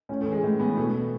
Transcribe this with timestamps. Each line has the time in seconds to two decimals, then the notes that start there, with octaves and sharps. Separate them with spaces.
0.09 A2 C#4
0.21 E3 A3
0.32 G#3
0.43 A2
0.59 E3 B3
0.76 B2 A3